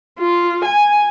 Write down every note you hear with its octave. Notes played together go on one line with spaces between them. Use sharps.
F4
G#5